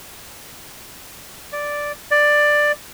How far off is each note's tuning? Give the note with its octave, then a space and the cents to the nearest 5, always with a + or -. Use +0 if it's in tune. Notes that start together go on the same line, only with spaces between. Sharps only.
D5 -5
D5 +10